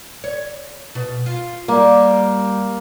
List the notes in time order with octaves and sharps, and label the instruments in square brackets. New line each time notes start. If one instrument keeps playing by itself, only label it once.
[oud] C#5
B2
F4
[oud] G3 [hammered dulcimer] A#3